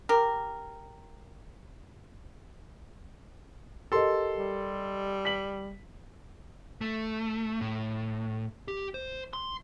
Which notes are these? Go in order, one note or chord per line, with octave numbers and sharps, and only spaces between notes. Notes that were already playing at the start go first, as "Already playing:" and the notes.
G4 A#4
G4 A4 A#4 D#5 C6
G3
B6 F#7
A3
A2
G4
C5
C6